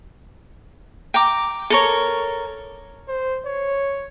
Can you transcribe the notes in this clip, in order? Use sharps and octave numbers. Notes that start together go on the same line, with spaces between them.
G5 A#5 D6
A4 A#4 C#5
C5
C#5